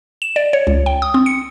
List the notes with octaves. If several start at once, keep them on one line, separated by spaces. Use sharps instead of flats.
E7
D5
C#5
C#2
G5
D#6
C4
C#7